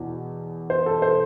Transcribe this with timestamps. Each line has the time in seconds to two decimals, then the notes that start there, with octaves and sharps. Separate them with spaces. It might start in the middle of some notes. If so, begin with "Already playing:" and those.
Already playing: E2 B2
0.70 C5
0.86 A4
1.02 C5